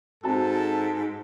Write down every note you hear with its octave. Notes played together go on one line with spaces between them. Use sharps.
G#2 C4 F#4 A4 A5